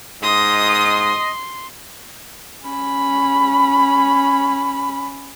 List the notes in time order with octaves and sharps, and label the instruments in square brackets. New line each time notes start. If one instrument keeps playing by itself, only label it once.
[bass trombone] G#2 [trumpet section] D#5 [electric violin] C6 [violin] D#6
[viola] C#4 B5